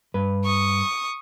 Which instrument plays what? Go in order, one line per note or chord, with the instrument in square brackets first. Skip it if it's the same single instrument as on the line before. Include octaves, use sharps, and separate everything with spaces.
[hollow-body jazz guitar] G2 B4
[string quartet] C#6 D#6